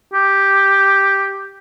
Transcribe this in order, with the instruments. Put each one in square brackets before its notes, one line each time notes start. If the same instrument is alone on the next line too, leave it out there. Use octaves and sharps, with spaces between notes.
[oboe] G4